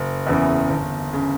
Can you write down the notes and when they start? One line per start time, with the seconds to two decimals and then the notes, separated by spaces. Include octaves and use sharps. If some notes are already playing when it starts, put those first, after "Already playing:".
Already playing: F#1
0.27 E2 C#3 E3
0.70 G1
1.13 C#3